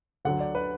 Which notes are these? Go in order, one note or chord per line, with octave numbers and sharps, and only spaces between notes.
D2 D3 F#3 F#5
D5
B4